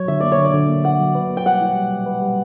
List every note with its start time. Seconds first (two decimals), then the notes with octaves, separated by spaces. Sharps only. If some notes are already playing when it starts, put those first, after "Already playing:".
Already playing: F#3 C#5
0.08 D3 E5
0.20 A#3 D5
0.32 C#5
0.38 D3
0.45 D5
0.54 D3
0.69 A#3
0.84 D3 F#5
1.00 F#3
1.15 B4
1.29 A#3
1.37 G5
1.45 G3 F#5
1.61 E4
1.75 G3
1.91 G3
2.06 B4
2.22 G3